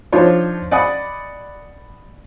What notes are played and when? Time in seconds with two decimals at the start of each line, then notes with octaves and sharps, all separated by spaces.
0.12 F3 D4 D#4 F4 C5 C#5
0.71 D5 D#5 F#5 G#5 B5 D#6